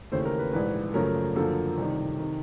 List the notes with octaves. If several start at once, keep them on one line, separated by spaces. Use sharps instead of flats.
D#2 C#3 E3 A3 C5
A#4
B4
A#1 G#2 E3 B4
F#2 C#3 F3 A3 A#4
F#2 D3 F3 A#3 A4
C2 C3 D#3
C3 D#3